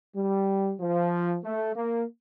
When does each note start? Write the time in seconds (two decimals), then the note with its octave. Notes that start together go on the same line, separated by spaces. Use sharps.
0.15 G3
0.80 F3
1.44 A3
1.75 A#3